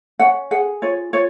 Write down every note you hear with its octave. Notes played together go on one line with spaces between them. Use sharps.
C#4 F#5
G#4 F#5
F4 C#5
F4 C#5